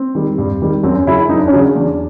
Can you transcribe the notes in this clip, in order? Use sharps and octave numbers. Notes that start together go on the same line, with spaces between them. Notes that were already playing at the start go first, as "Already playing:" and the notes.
Already playing: C4
D#3 G3
G2
D#3 G3
F#2 C4
C#4
C#3 F#3 E4
E4
F#2 D#4
D4
C#4
C#3 F#3 D4
E2